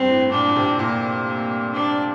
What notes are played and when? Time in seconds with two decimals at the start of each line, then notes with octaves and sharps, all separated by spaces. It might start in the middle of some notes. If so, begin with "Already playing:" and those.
Already playing: G2 C4
0.08 A2
0.32 A#2 D4
0.49 A#2
0.56 C3
0.79 A#2 A#3
1.27 A#3
1.73 D4